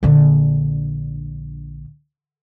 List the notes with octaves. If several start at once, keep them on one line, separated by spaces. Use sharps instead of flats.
A#1 D3